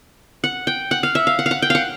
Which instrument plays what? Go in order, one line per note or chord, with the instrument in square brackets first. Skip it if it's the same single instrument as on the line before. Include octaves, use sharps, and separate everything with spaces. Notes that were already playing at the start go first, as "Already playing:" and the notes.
[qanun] F#5
G5
F#5
F5
E5
F5
F#5
F5
F#5
G5
F5 F#5